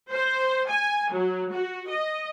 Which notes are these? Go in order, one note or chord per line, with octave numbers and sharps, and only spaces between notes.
C5
G#5
F#3
F#4
D#5